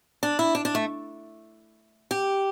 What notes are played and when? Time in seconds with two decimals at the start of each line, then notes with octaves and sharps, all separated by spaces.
0.23 D4
0.39 E4
0.55 D4
0.65 D4
0.75 A3
2.11 G4